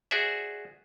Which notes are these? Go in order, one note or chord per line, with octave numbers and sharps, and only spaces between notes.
F#4 G#4 C5 D5 E5